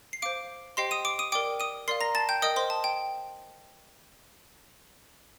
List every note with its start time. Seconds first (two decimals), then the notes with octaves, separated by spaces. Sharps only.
0.13 C7
0.22 C5 F5 D6 D7
0.77 G4 C5 D#5 G5 C6 C7
0.91 D#6 D#7
1.05 D6 D7
1.19 D#6 D#7
1.32 A#4 D5 G5 D6 D7
1.60 D#6 D#7
1.88 A#4 D5 F5 C6 C7
2.01 A#5 A#6
2.15 A5 A6
2.29 G5 G6
2.42 A#4 D#5 G5 D#6
2.56 C5 C6
2.70 A5
2.84 G5